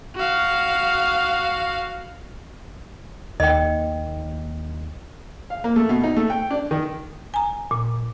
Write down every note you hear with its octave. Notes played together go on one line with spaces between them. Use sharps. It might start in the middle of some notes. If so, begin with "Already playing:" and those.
F#4 F5
D#2 D#5 G5
F5
A#3
A3
B2
D#4
A3
G5
D4
D#3
G#5 A#5
A#2